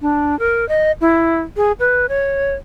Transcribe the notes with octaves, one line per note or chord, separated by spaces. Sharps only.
D4
A#4
D#5
E4
G#4
B4
C#5